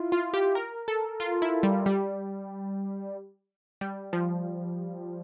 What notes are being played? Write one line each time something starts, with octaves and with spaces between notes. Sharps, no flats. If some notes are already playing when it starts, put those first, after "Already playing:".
Already playing: E4 F4
F4
G4
A#4
A4
F4
E4
G3
G3
G3
F3